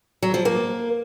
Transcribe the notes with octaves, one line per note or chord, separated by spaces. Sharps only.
F#3
F3
A#3